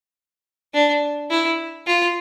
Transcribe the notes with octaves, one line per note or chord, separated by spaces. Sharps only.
D4
E4
F4